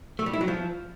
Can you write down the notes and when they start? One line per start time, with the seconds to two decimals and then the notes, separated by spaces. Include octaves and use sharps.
0.19 A3
0.26 G3
0.33 E4
0.41 F#3
0.48 F3